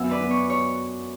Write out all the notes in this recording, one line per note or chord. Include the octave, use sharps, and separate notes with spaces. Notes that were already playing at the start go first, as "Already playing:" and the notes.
Already playing: F#2 B3 E5 F#5 G#5
B4 D5
B3
C#5
C#5